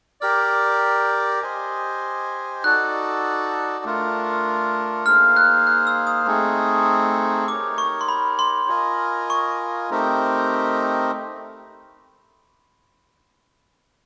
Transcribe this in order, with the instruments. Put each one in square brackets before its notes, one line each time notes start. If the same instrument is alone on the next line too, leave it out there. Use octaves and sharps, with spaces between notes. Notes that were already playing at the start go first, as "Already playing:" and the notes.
[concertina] G4 A#4 D5 [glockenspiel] F6
[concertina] G4 C5 D#5 G#5
[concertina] D#4 F#4 A4 D5 [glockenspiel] F#6
[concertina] A3 D4 F4 A#4
[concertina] A#3 D#4 G#4 C5 F5 [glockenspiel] F6
[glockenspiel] F#6
F#6
E6
D#6
[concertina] A3 C4 D#4 G#4
[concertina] D#4 G4 A#4 C#5 [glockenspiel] D6
[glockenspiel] C#6
C6
B5
C6
[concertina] F4 A#4 D#5 G#5
[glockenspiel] C#6
[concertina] A3 C4 D#4 G4 A#4